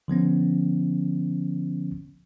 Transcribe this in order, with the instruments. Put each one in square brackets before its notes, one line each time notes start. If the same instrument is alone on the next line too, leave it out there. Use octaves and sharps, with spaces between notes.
[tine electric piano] D3 F3 B3 C#4